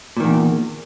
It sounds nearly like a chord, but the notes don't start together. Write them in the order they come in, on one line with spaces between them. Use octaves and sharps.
A#2 D#3 E2